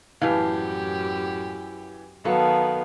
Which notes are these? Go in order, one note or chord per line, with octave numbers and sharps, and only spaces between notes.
F#2 A2 E3 G4 F5
D#3 F#3 B3 A4 F5